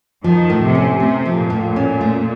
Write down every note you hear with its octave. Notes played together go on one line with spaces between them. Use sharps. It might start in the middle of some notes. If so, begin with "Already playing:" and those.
D#3 F3
A2
C3
C#4
C3 A3
F3
A#2
A2
C#4
A3